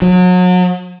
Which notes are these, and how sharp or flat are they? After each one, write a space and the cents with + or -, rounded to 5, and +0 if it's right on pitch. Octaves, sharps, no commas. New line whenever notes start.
F#3 -35